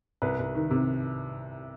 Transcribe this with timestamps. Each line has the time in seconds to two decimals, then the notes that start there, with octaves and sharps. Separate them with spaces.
0.22 C2 B4
0.39 C2
0.55 D#3
0.70 C3